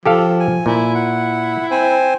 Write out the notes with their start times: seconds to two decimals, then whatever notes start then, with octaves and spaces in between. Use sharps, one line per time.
0.06 F3 G4 A4 F5
0.40 G#5
0.66 A#2 E4
0.95 F#5
1.71 C4 C5 G#5